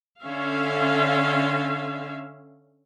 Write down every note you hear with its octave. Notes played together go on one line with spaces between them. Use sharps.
D3 C#4 E5 F5